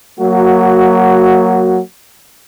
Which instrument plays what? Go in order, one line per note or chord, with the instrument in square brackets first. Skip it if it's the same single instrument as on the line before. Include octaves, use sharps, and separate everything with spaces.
[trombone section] F#3 A#3 F#4